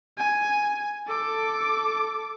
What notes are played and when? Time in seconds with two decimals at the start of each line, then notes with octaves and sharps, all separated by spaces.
0.18 G#5
1.07 A4 D6